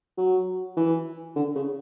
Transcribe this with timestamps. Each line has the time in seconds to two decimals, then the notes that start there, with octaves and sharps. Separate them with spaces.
0.18 F#3
0.77 E3
1.36 D3
1.55 C#3